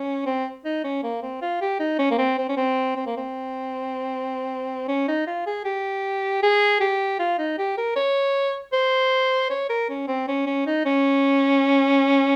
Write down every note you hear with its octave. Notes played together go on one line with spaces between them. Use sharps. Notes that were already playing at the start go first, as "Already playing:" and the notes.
Already playing: C#4
C4
D#4
C#4
A#3
C4
F4
G4
D#4
C#4
A#3
C4
C4
C#4
C4
C4
A#3
C4
C#4
D#4
F4
G#4
G4
G#4
G4
F4
D#4
G4
A#4
C#5
C5
C#5
A#4
C#4
C4
C#4
C#4
D#4
C#4